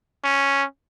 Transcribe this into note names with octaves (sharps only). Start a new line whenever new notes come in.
C#4